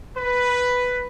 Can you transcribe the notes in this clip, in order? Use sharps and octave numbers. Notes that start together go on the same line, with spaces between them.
B4